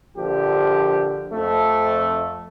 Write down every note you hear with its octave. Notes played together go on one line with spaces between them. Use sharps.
A#1 D3 F3 G4
F2 A3